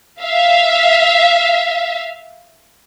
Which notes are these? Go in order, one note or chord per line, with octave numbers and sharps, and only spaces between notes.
E5 F5